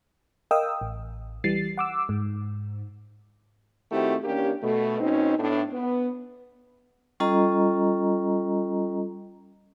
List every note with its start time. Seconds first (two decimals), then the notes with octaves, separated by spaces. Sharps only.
0.51 A#4 D#5 F5 G5 D#6 E6
0.81 A1
1.44 E3 G3 A6 C7
1.78 F#5 D6 E6
2.09 G#2
3.90 D#3 A3 C4 E4 F#4 G4
4.23 E3 A#3 C#4 D4 G4
4.62 B2 A3
5.00 B2 C4 C#4 D#4
5.38 A2 B3 D4
5.72 B3
7.20 G3 C#4 F4 A4 D#5 A#5